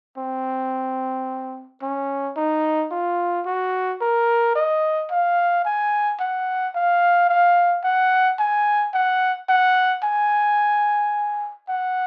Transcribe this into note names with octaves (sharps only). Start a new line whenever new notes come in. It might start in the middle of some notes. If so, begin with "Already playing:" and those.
C4
C#4
D#4
F4
F#4
A#4
D#5
F5
G#5
F#5
F5
F5
F#5
G#5
F#5
F#5
G#5
F#5